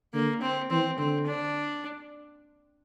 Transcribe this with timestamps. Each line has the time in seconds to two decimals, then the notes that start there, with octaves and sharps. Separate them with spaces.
0.14 D3 A#3
0.42 C4
0.71 E3 C4
0.98 D3 C4
1.26 D4